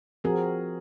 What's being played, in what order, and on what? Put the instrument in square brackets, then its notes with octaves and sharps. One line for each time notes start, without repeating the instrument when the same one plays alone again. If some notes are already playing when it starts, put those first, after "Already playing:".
[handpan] F3 C4 F#4 A#4 [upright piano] G#4